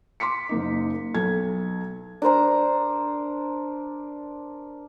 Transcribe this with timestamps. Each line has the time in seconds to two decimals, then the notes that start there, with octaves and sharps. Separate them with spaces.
0.20 C6 D6 B6 C#7
0.49 F#1 A#3 D#4
1.14 B1 A4 G#6
2.22 D4 A#4 C5 A#5